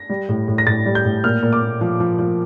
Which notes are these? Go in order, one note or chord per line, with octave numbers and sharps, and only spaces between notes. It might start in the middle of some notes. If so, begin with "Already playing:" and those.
Already playing: A#6
G3
A2
A2
A#6
A2 A6
G3
G6
A2
A#2 F6
A#2
D6
A#2
F3
F3
F3